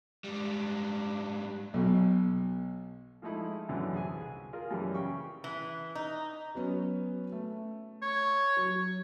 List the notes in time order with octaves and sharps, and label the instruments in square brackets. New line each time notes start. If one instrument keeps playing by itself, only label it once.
[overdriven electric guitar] G#2 G3
[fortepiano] B1 B2
F3 G#3 A3 D#4 E4
F#2 B2 D3 E3 A4
C2 G#4 G#5
F4 G#4 A#4
F#2 E3 G3
C#3 G5 C#6
[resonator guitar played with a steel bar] E3
D#4
[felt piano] F#3 B3 C#4
A3
[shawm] C#5
[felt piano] F#3